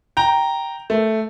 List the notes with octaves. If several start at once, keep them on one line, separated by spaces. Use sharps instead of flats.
G5 A#5
A3